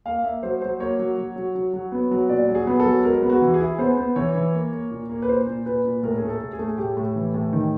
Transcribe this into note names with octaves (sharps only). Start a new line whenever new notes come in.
A#3 F5
A#3 E5
F#3 C5
F#3 C5
A#3 C#5
F#3
F#3
F#3
F#3
F#3
B3
F#3
A#2 D5
F#3
G#4
B3
A4
F#3
G#3 A#4
B3
F#4
E3
G#4
E4
B3 C5
B3
E3 C#5
E3
A#3
A#3
A#2
A#3
B4
A#2 C5
A#2
A#2 B4
A#2
A2 A#4
A3 G#4
A4
A2
G#4
A3
G#4
A2 G4
A2
E3
A2
D#3